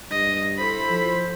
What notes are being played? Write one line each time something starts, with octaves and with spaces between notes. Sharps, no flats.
G2 D#5
E4 A4 C5 B5
F3